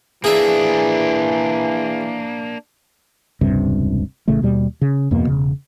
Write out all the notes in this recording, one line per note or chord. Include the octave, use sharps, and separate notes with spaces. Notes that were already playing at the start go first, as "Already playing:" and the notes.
E3 A#3 D4 G#4 E5
E1 C#2 G2 C3
A1 C#3 A3
D#2 B2 G3
C#3
E2 G2 B2 A#3
E1 C#3